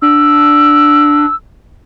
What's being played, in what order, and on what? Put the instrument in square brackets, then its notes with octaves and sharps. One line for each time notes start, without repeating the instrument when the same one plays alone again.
[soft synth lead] D4 [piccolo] E6